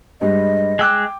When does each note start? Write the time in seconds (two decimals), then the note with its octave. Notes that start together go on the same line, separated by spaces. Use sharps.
0.21 G2 G3 G#3 D#5
0.79 G#3 G5 D6 E6 F#6